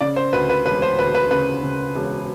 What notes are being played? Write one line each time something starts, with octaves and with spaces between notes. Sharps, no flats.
C#3 D5
C5
D2 B4
B4
E1 B4
C5
D2 B4
B4
C#3 B4
C#3
E1